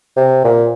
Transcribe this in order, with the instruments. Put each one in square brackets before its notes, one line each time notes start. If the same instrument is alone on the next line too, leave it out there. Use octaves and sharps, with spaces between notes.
[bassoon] C3
A#2